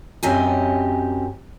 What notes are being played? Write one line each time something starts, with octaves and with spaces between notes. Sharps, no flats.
F#2 F#3 C4 G4 D#5 G#5